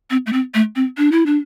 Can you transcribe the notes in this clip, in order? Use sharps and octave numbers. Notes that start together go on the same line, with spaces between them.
C4
A3
C4
A3
C4
D4
E4
D4